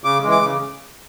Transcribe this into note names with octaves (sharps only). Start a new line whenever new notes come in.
C#3 D6
E3 G#3
D6
C#3